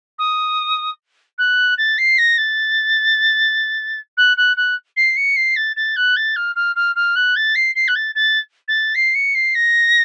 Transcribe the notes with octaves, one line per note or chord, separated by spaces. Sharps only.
D#6
F#6
A6
C7
A#6
A6
F#6
F#6
F#6
C7
C#7
C7
A6
A6
F#6
A6
F6
F6
F6
F6
F#6
A6
C7
C7
F#6
A6
A6
A6
C7
C#7
C7
A#6